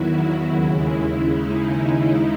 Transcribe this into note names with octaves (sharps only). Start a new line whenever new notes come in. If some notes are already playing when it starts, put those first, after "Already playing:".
Already playing: E2 D#3 F#3 E4 F#4
D#2 C#3 G#3
D#4